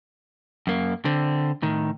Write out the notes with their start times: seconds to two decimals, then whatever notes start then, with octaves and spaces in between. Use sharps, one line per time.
0.67 F#2 A#3
1.05 D3 C4
1.62 A2 D#3